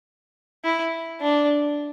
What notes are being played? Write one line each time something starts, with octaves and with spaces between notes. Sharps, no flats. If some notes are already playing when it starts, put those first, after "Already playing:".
E4
D4